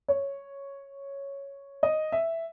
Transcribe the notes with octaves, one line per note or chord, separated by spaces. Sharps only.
C#5
D#5
E5